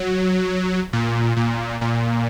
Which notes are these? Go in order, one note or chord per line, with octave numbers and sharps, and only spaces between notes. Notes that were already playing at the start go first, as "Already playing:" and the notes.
Already playing: F#3
A#2
A#2
A#2